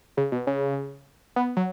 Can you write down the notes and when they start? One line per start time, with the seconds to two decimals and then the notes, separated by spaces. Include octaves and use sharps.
0.17 C#3
0.32 B2
0.47 C#3
1.36 B3
1.57 F#3